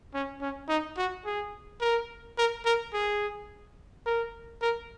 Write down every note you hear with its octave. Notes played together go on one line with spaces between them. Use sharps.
C#4
C#4
D#4
F#4
G#4
A#4
A#4
A#4
G#4
A#4
A#4